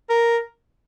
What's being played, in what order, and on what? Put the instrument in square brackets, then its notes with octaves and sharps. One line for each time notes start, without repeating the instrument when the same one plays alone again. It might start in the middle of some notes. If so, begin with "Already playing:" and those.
[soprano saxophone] A#4